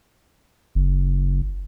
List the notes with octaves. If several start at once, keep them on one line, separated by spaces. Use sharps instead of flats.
F#1